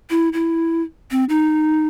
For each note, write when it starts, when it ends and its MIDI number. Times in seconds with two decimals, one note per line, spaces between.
0.10 0.29 64
0.33 0.82 64
1.11 1.24 60
1.29 1.88 63